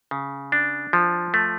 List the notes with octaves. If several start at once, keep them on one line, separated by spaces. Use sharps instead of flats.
C#3
D4
F3
A3